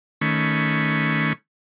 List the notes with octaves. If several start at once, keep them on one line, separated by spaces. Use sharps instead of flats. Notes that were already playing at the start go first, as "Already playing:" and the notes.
D#3 A3 C#4 B5 C#6